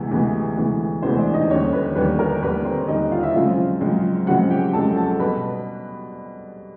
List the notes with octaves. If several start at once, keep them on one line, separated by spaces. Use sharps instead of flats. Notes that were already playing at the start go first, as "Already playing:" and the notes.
Already playing: D2 C3 E3 G#3 B3
D2 C3 E3 G#3 B3
D2 C3 E3 G#3 B3
D2 C3 E3 G#3 B3 C4 C5
D4 D5
D#4 D#5
D#2 D3 G3 C#4 C#5
B4
D#2 D3 G3 B4
A#4
D#2 D3 G3 B4
C4 C5
D#2 D3 G3 D#4 D#5
F4 F5
E4 E5
F#2 C#3 F3 G#3 C4 F4 F5
F#2 C#3 F3 G#3 C4
F#2 C#3 F3 G#3 C4 F#4 F#5
G4 G5
F#2 C#3 F3 G#3 C4 A4 A5
A4 A5
B2 G3 B3 B4 B5